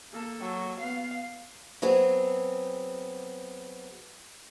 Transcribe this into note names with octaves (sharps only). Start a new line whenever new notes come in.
A#3 A4
F#3
B3 F5
F#3 B3 C4 G#4